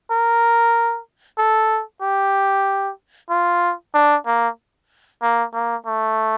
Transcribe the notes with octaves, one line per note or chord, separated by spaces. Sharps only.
A#4
A4
G4
F4
D4
A#3
A#3
A#3
A3